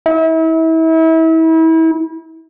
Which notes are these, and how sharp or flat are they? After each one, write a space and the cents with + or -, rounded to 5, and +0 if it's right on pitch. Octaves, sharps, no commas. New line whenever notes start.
E4 -35